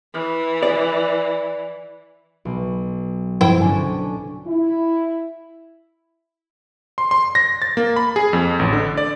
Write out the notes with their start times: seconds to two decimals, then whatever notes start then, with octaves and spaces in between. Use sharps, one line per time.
0.14 E3
0.63 D5
2.45 B1
3.41 G2 F3 E4 C5 G5
3.61 D3 C#4 D4 G#5
4.47 E4
6.98 C6
7.11 C6
7.35 A#6
7.62 A6
7.77 A#3
7.96 B5
8.16 G#4
8.33 F2
8.59 A1
8.73 D3
8.97 D5